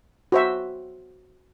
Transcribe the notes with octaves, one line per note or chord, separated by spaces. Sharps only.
F#4 C5 E5